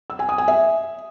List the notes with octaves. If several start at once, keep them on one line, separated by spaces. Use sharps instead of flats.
E6
G#5
D#6
G#5
E5